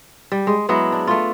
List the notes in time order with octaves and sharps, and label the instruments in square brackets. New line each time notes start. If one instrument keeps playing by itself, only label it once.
[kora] G3
G#3
F#3 G#3 B3 E4
D4
A3 F4